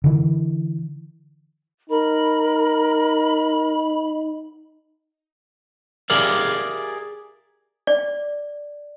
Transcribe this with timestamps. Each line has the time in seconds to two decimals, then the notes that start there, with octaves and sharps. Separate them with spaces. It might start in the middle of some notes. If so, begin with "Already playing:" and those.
0.04 D3 E3
1.90 D#4 A#4 B5
6.10 G4 G#4 A#4 D5 E5 F5
7.87 D5